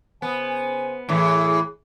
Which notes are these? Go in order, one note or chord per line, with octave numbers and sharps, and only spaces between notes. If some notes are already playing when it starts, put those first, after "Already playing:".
C#3 B3 C5 G#5
A2 E3 G#4